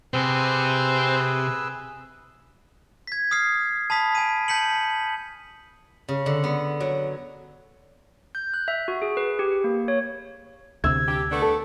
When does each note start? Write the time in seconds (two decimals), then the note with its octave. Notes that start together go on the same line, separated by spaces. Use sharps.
0.14 C3 C4 G#4 B4 E6
3.07 G#6 B6
3.31 D#6 F6 C7
3.90 A5 B5 D#6 B6
4.15 G#5 D#7
4.48 A5 G6 B6 C#7 F#7
6.09 C#3
6.26 D3
6.44 B3
6.80 F#3
8.35 G6
8.54 F#6
8.68 E5
8.88 F#4
9.02 G#4
9.17 B4
9.39 G4
9.64 A#3
9.88 C#5
10.84 D2 C3 E6 G#6
11.07 D4 G4
11.31 A3 B3 D4
11.42 A4